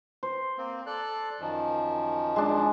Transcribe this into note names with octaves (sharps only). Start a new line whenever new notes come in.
C5
A#3 C4
A4 D5 F#6
F#2 D#3 F3
G#3 D4